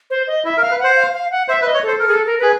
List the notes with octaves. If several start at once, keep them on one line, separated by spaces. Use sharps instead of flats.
C5
D#5
E4 E5
A#4
F5
B4
C5 F#5
F5
F5
F#5
C5 E5
B4
D#5
C#5
A4 C5
A4 A#4
G#4
A4
A#4
G#4 B4